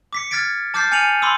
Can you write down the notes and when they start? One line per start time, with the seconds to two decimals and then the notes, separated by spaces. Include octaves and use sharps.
0.13 D6 B6 C#7
0.31 F6 G#6 A6 B6 D7
0.74 A5 D6 F6 G6 A6 C7
0.92 G#5 F6 C#7 D#7 F7 F#7
1.22 B5 C6 D6 E6